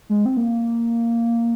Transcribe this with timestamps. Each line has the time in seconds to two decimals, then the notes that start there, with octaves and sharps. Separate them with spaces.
0.09 G#3
0.25 C4
0.37 A#3